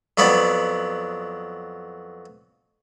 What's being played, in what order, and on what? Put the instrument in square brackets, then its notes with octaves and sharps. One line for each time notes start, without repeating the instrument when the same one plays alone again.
[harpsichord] F2 F#3 B3 D5 B5